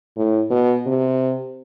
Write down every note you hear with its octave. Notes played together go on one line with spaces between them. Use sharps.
A2
B2
C3